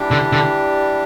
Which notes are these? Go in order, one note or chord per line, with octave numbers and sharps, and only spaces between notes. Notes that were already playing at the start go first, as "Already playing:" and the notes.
Already playing: E3 G3 D4 G4
D3
D3